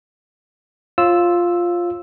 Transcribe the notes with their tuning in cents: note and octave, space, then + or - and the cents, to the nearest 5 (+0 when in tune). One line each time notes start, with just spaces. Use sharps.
F4 +0 C#5 -40 E6 +0